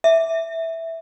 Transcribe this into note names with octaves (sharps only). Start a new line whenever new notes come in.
E5